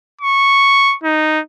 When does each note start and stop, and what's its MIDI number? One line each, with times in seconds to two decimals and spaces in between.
0.21 0.95 85
1.03 1.40 63